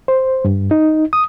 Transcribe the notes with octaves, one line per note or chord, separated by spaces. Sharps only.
C5
G2
D#4
D#6